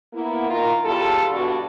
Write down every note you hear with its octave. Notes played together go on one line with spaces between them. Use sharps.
A#3 B3 E4
D#3 F4 A#4
E2 G3 F4 A4
G2 B2 D4 F#4